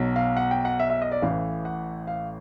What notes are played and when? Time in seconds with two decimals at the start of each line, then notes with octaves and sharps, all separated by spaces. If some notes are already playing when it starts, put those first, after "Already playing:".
Already playing: B1 B2 F#3
0.16 F5
0.37 F#5
0.51 G5
0.65 F#5
0.79 E5
0.90 E5
1.02 D#5
1.12 D5
1.22 A1 A2 E3 F5
1.65 F#5
2.07 F5